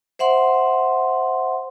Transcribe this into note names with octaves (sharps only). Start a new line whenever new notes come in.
C5 E5 F#5 C6